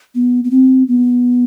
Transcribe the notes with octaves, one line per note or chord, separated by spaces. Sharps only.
B3
B3
C4
B3